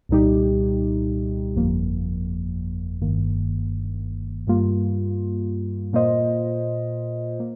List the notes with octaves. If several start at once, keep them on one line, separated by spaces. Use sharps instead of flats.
C2 A#2 G3 D#4 G4
G1 F2 F3 A#3
G1 G2 D#3 A#3
G2 G3 A#3 F4
A#2 A#3 F4 C5 D#5
A#3